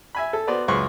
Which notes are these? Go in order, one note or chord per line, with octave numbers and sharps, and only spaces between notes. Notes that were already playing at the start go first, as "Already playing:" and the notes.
E5 G#5 B5
A4
B3 F#4 B4 C5 D5
C#2 F#2 B4 C6 C#6